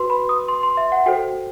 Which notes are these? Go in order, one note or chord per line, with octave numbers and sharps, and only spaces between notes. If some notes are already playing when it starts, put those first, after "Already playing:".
Already playing: F#4 B4 C6
B5
D#6
C6
C6
E5
F#5
F#4 A4 C5 G5